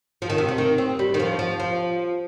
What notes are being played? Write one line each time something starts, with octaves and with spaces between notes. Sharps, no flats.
F3
D#3
C3
C3
D#3
C4
G3
D#3
F3
F3
F3